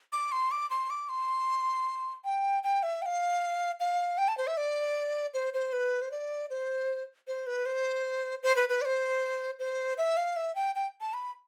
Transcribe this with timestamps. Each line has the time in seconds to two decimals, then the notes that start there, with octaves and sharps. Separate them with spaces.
0.13 D6
0.32 C6
0.51 D6
0.70 C6
0.90 D6
1.09 C6
2.25 G5
2.63 G5
2.83 E5
3.02 G5
3.06 F5
3.80 F5
4.18 G5
4.28 A5
4.38 C5
4.47 E5
4.57 D5
5.34 C5
5.54 C5
5.73 B4
6.02 C5
6.11 D5
6.50 C5
7.27 C5
7.47 B4
7.66 C5
8.43 C5
8.56 B4
8.69 B4
8.81 D5
8.85 C5
9.59 C5
9.98 E5
10.17 F5
10.36 E5
10.55 G5
10.75 G5
11.01 A5
11.14 B5